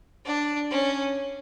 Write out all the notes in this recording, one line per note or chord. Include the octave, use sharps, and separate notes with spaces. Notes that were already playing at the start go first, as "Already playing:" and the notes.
D4
C#4